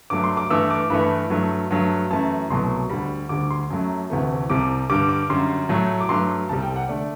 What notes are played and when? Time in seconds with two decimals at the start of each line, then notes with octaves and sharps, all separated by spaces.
0.10 G2 F#3 A3 D6
0.24 C6
0.37 D6
0.50 G2 E3 A3 E6
0.70 D6
0.90 G2 E3 A3 B5
1.30 G2 F#3 A3
1.71 G2 F#3 A3
2.11 F#2 E3 A3 A5
2.50 C2 B2 F#3 A3 C6
2.89 D2 D3 G3 B5
3.29 D2 D3 G3 D6
3.51 C6
3.70 F#2 F#3 A3
4.10 D2 C3 E3 A3
4.50 C2 C3 G3 D6
4.90 G2 D3 G3 D6
5.09 D6
5.30 F#2 D3 G3 C6
5.69 A2 F#3 A3
6.01 D6
6.09 G2 F#3 A3 C6
6.49 C2 C3 G3 A5
6.62 G5
6.76 F#5
6.89 D3 A3 D5